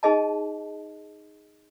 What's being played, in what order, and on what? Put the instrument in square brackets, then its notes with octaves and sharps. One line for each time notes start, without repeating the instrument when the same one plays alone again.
[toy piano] D#4 G#4 D#5 A5